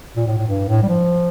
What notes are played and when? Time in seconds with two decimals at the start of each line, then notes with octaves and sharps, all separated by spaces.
0.17 A#2
0.27 A2
0.38 A2
0.47 G2
0.69 A2
0.83 G3
0.89 F3